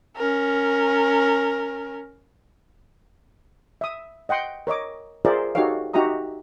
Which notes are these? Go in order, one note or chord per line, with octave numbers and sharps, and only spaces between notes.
C#4 A#4
E5 D#6
D#5 F#5 G5 C6
A#4 C#5 D#5 D6
F4 G#4 A#4 C5 D5 E5
D#4 F#4 G4 A4 C#5 F5
D#4 F#4 G4 E5 A#5 D#6